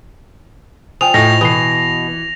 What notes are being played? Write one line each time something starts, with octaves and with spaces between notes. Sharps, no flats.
F3 G5 G#5 D#6 F7
A2 D#5 A#6
B2 E3 D#6 C7 G7